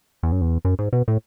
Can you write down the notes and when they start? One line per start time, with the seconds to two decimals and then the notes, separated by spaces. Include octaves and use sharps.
0.23 E2
0.32 F#2
0.41 E2
0.65 F#2
0.79 G#2
0.93 B2
1.08 A2